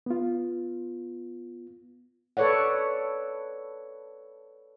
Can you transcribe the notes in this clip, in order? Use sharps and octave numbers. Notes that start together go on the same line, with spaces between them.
B3 F4
A4 B4 C#5 D5 F#5